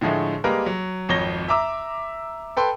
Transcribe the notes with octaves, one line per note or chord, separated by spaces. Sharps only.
A2 D3 F3 G#3 A3
G3 G#3 A#3 A#4 B4
F#3
G#1 F2 C#5 A#6 G7
E5 A#5 D6 E6
A4 B4 G5 C6